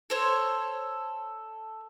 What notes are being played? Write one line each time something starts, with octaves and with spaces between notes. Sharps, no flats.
A4 C5 C#5